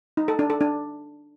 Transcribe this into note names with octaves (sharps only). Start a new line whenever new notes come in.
D#4
A4
D4
A4
D4